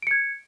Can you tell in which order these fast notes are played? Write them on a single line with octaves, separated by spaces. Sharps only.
D7 C#7 G#6